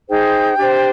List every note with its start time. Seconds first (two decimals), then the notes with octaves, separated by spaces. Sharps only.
0.09 D#4 G#4 C5 G5
0.57 D4 G4 C5